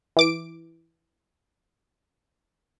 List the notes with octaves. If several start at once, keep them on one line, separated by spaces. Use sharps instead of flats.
E3 D6 D7